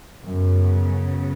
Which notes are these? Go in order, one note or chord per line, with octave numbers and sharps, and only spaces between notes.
F#2 C#3 F#3 B3